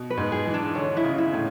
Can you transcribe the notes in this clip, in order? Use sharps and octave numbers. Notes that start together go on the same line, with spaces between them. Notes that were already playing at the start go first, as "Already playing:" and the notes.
Already playing: B2
B4
G#2
G#4
E3
D4
D3 C#5
E4
C#3
E4
A2